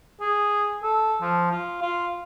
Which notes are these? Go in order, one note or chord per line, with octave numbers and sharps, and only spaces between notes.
G#4
A4
F3
F4
F4